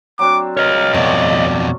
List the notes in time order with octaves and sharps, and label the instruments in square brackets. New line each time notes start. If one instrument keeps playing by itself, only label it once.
[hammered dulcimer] F#3 C4 D4 [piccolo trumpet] D6
[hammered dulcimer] A#4 [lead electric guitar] C#5 D#5 [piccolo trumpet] F6
[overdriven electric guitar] F2 B2 [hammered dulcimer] A3 [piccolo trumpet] D5